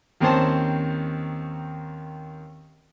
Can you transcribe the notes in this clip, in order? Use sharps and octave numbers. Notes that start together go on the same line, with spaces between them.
D#2 D#3 C4 C#4 C5 A5